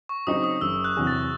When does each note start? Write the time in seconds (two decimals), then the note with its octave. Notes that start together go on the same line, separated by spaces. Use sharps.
0.09 C#6
0.27 C#3 F#3 C4 D#4 D#6
0.44 D#6
0.61 F#1 E6
0.84 F#6
0.97 E2 C3 F#3
1.07 A6